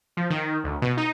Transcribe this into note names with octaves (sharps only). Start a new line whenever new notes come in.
F3
D#3
D2
B2
D#4